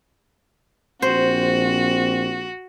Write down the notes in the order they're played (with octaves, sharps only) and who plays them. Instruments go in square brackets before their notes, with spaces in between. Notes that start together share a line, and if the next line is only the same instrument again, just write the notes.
[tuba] A#1 [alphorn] C4 [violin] F#4 [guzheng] C5